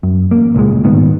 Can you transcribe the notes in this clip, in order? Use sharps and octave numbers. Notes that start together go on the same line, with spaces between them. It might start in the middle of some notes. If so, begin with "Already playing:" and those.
F#2
A1 A#3
G1 C#2 A#2 G#3
D#1 G#2 D#3 B3